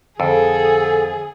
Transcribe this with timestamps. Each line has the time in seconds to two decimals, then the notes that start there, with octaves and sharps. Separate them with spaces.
0.20 F2 D3 G#4 A4